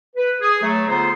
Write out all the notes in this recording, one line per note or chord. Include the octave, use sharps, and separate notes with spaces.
B4
G#4
F#3 A3
D3 B3 D#4 F4 G#4 C5